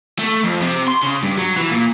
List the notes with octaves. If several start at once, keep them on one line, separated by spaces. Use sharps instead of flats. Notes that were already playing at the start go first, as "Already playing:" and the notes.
A3
F2
C3
C6
C#3
G2
F#3
E3
A#2